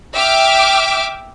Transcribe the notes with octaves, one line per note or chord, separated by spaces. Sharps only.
E5 G5 D6 F6